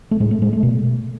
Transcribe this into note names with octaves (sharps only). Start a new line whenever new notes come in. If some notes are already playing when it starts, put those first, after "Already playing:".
A3
A2 G#3
A3
G#3
A3
B2